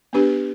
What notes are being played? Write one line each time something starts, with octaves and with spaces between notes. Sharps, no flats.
B3 D4 G4 B4